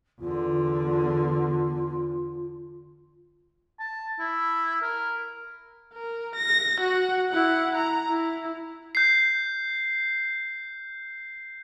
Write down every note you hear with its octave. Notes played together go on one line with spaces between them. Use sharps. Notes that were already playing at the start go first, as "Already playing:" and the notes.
E2 D3 F4
A5
E4
A#4
A#4
A#6
F#4 F#5
E4 F#5
A#5
E4
G6 C7